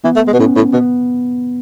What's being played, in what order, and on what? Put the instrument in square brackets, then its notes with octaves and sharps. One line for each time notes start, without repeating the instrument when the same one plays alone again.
[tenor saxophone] E3 [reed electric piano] B3
[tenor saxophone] A3
G#3
[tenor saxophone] B2 [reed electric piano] B3
[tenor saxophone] A2 [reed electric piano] C#4
[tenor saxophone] A2
[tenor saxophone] B2 [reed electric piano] B3